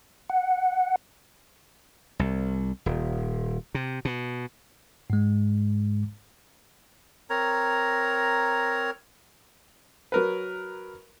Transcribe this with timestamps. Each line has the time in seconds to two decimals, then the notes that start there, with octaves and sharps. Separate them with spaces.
0.30 F#5
2.19 C2
2.86 D#1
3.75 C3
4.05 B2
5.10 G#2 G#3
7.30 C4 A#4 C#5 A#5
10.12 F#3 A#4 B4